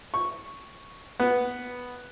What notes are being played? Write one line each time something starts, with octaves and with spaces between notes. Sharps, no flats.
C#6
B3